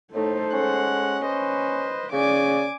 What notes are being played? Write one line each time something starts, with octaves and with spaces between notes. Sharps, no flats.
A2 A3 D#4 A4 C5
G#3 C#4 F#5
B4 C5 D#5
C#3 C#4 D5 G#5 D6